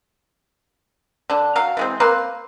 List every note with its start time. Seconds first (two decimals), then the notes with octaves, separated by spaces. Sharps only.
1.30 D3 D4
1.56 F#3 F5
1.77 E3 G#3 C4
2.00 A#3 C4 B4 C6